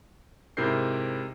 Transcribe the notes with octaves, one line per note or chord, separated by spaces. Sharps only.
G#2 C3 E4 A#4 G6 C7